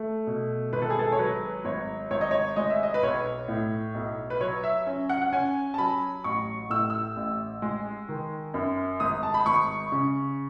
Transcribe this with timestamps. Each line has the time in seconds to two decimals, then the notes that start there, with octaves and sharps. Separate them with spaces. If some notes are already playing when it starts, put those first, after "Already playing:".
Already playing: A3
0.27 B2
0.73 G#1 B4
0.82 A4
0.90 G#4
0.99 A4
1.12 C#5
1.19 F#3 B4
1.65 G#1 C#5
2.11 G#1 C#5
2.21 D#5
2.31 C#5
2.56 G#3 D#5
2.70 E5
2.83 D#5
2.94 B4
3.03 B1 C#5
3.48 A2
3.95 B1
4.30 B4
4.41 F#3 C#5
4.64 E5
4.87 C#4
5.09 F#5
5.22 F#5
5.32 C#4 G#5
5.74 A5
5.78 F#3 B5
6.24 A1 C#6
6.70 A2 E6
6.90 E6
7.17 A1
7.62 G#3
8.09 D#3
8.54 F#2
9.00 G#1 D#6
9.23 A5
9.34 B5
9.46 G#1 C#6
9.92 C#3